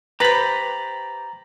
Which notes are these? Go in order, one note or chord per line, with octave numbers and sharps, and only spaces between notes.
G4 B4 C5 A#5 B5 A6